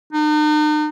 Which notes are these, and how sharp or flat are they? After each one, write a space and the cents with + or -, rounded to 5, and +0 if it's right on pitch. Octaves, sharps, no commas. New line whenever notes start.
D#4 -45